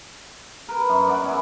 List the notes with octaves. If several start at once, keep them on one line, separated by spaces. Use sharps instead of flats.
A#4 B4
F#2
D5 F#5
C#4 E4